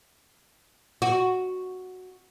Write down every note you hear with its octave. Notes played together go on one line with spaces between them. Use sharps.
F#4